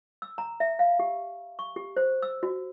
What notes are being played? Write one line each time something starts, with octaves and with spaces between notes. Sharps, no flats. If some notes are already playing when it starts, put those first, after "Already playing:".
E6
A#5
E5
F5
G4
C#6
G4
C5
E6
F#4